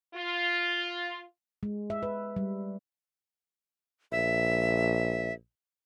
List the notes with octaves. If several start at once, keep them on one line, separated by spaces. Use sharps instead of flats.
F4
G#3
E5
B4
G3
A#1 E5